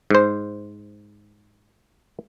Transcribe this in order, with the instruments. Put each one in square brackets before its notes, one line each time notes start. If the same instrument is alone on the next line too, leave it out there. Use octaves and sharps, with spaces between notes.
[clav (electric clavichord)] G#2 C5